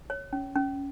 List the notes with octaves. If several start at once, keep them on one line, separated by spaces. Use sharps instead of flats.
C#5
C#4
C#4